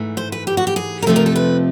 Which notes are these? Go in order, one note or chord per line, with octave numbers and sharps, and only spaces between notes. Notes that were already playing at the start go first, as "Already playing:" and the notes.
Already playing: G#2 E3 A3
C5
B4
G4
F#4
G4
G#4
A#4
F2 C3 F3 A3 C4 A4
A#4
A4
B4